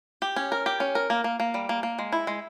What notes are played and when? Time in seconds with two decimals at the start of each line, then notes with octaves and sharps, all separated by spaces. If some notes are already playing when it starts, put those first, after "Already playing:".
0.22 G4
0.36 C#4
0.52 A#4
0.66 G4
0.80 C#4
0.95 A#4
1.10 A#3
1.24 A#3
1.40 A#3
1.54 G3
1.69 A#3
1.83 A#3
1.99 G#3
2.12 E4
2.27 G#3